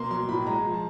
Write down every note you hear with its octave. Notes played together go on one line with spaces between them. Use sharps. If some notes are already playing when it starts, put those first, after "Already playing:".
Already playing: B2 A#3 C6
F#3 C6
A2 B5
G#3 A#5
F3
A5